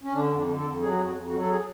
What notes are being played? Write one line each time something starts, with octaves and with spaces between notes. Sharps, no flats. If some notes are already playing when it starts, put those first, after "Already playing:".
C#4
D3 D4
F2
D4
D3
A4
F2
F#3 G#4
F#4
F2 G#4
F#4
F2
F#4
F#3
A4
G#4